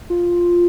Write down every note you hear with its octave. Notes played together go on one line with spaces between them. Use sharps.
F4